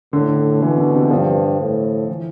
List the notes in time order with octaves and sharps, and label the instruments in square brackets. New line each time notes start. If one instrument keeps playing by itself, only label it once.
[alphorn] A2 [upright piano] D3
[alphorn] B2 [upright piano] E3
[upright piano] D3
C3
[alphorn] G2 [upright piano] F3
[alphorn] A2
[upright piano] E3